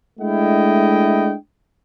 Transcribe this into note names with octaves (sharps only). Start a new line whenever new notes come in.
G#3 A3 D4 E4 D#5 G5